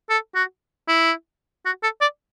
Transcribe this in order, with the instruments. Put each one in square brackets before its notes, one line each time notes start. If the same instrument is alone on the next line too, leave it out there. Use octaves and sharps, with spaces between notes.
[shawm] A4
F#4
E4
F#4
A4
D5